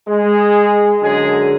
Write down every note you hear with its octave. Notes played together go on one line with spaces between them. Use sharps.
G#3 G#4
F#2 D3 F#3 G#3 G#4